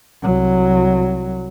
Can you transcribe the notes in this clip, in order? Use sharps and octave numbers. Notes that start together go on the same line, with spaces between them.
C2 F#3